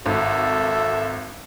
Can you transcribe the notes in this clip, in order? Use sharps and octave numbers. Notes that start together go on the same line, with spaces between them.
G#1 F#4 A4 E5